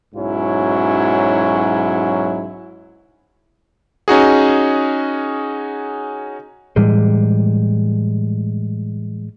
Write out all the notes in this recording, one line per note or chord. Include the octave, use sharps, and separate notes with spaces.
B1 G#2 F#3 C#4 E4
C#4 D#4 F#4 G#4
A2 E3 G3 G#3